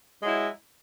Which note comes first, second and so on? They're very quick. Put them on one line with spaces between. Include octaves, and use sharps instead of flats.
G#3 F#3 E4